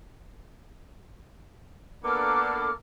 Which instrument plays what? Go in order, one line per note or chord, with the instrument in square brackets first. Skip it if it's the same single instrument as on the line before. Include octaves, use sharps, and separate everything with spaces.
[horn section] A#3 B3 D4 [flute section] A4 D6 F6